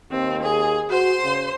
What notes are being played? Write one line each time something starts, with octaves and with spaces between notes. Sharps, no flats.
D#2 C4
G#4
F#4 C5 C6
C#3